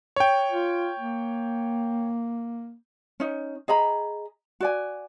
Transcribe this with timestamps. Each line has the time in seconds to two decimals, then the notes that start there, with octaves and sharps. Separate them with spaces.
0.16 C#5 G5
0.52 F4
1.00 A#3
3.20 C#4 D#4
3.68 G#4 D#5 A#5 B5
4.60 F#4 D5 G#5